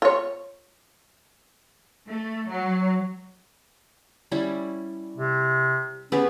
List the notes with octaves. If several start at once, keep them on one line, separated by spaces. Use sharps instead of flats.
F4 C#5
A3
F#3
G3 C#4 E4
C3
B3 C#4 G4 G#4